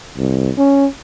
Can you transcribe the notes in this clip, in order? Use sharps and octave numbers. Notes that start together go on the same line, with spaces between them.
C2
C#4